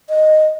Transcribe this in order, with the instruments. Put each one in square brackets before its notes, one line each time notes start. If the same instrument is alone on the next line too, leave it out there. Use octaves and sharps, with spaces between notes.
[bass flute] D#5